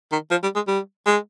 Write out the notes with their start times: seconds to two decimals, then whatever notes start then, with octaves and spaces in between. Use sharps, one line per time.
0.12 D#3
0.30 F3
0.43 G3
0.55 G#3
0.67 G3
1.06 G#3